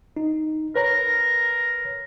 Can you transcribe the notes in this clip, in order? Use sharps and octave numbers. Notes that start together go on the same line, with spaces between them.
D#4
A#4 B4 C#5 A#5